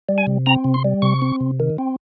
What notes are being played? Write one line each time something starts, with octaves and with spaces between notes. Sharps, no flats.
G3
G#5
C3
C4 A#5
C3
C6
G3
C3 C#6
C4
C3
D#3
C4